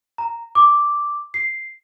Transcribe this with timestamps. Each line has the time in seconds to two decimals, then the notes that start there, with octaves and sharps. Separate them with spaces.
0.18 A#5
0.55 D6
1.34 C7